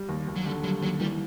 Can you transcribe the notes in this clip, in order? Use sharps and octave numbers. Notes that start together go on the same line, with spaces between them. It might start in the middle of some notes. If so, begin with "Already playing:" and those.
Already playing: G3
D#2
D#2
F#3
D3 G3
F#3 G3
D#2 F#3
E3 G3